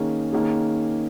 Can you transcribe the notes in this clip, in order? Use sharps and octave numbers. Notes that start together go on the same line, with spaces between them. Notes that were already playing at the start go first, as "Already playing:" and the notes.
Already playing: D#3 A#3 C#4 G#4
D#3 A#3 C#4 G#4